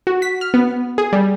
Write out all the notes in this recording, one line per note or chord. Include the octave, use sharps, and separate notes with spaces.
F#4
B6
F6
B3
G#4
G3